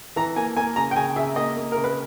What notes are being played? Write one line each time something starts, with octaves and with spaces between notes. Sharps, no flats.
E3 A#5
A#3 G#5
A#3 G#5
C#3 A#5
G5
C#3 G#5
C#3 E5
A#3 D#5
A#3
C#3 A#4
B4